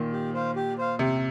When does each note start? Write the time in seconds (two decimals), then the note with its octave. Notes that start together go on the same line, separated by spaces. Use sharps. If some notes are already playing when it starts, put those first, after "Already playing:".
Already playing: A#2 D#3
0.13 G4
0.34 C5 F5
0.56 G4
0.78 C5 F5
0.99 C3 G4